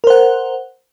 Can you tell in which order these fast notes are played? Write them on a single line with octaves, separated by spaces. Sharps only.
A#4 C5 F#5